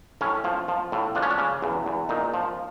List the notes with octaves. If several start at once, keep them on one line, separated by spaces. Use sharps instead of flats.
A2 C#4
F3
F3
A2
F3 D4
C#4
D4
C#3
E2
E2
A#2 D#4
F3